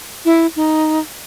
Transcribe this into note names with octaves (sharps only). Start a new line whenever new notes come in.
E4
D#4